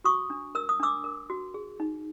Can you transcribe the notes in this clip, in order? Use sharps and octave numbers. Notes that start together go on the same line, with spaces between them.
F#4 C#6 D#6
D4
A#4 E6
D#6
D4 D6 E6
A#4
F#4
G#4
D#4